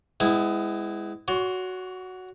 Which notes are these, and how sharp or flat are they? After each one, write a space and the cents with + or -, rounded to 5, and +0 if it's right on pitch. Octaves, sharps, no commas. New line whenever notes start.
G#3 -15 B3 +30 E4 +0
F#4 +0 C#5 +35 C6 +20